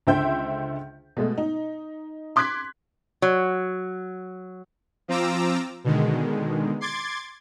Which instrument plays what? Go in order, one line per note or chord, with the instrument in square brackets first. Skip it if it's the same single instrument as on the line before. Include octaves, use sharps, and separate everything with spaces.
[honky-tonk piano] C#2 D3 C5 E5 G5 G6
B2 G#3 A3
D#4
C6 D6 F#6 G#6 B6
[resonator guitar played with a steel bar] F#3
[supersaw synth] F3 C4 F4 A#5 D6 E6
B2 D3 D#3 G#3
C6 D6 G#6 A6